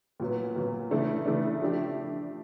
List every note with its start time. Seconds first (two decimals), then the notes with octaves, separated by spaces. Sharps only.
0.20 A#2 F#3 B3
0.56 A#2 F#3 B3
0.91 C#3 E3 A3 D4
1.25 C#3 E3 A3 D4
1.61 F3 A3 D4 G4